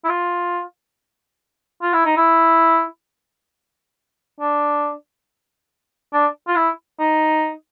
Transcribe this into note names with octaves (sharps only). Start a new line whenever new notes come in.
E4
F4
F4
E4
D#4
E4
D4
D4
F4
E4
D#4